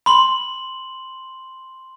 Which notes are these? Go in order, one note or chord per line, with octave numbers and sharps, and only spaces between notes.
B5 C6 F#7